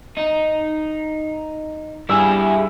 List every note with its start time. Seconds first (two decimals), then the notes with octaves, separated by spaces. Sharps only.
0.17 D#4
2.09 G2 G3 E4 G#4 E6